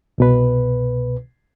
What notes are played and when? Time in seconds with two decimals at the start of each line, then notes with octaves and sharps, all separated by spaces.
0.18 C2 B2 B4